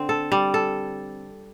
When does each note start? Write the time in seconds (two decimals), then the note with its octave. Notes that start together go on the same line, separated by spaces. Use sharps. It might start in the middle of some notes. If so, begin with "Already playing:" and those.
Already playing: D3 C4
0.09 A4
0.32 G3
0.54 A4